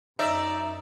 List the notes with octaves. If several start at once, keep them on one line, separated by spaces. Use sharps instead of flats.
F#2 D#4 D5 E5